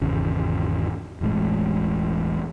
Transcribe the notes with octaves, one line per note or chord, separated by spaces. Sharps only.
G#1 E2 C#3
E1 A1 A2 G#3